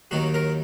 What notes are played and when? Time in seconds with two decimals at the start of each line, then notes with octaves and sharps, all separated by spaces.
0.11 D#2 D#3 F#3 F#4
0.34 A#4